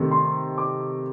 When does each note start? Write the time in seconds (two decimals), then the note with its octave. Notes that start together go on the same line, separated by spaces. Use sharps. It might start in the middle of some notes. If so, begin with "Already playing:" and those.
Already playing: C3 D#3 A3 C4
0.11 C6
0.58 D6